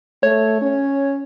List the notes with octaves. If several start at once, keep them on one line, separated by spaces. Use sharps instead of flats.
A3 C#5
C#4